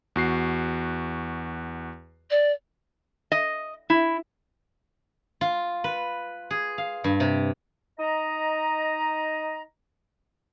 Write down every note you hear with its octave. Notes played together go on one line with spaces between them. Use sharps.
E2 F#4 C7
D5
D#5
E4
F4
B4
G#4
F5
G2
C3
D#4 D#5 A#5